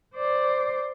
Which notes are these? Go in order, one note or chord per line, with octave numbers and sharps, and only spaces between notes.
C5 D5